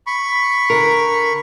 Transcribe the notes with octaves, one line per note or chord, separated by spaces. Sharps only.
B5 C#6
D3 A#4